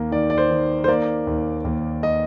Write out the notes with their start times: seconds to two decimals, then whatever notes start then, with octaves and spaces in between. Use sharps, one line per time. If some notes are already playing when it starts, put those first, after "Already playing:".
Already playing: D#2 A#3
0.12 D#3 D5
0.30 D5
0.38 C5
0.51 D#3
0.84 C5
0.88 A#3 D5
1.27 D#2
1.65 D#2
2.03 D#5